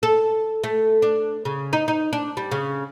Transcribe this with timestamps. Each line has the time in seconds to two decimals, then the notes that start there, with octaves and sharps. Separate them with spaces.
0.03 A4
0.64 A3
1.02 D4
1.45 C#3
1.73 D#4
1.88 D#4
2.13 D4
2.37 G3
2.51 C#3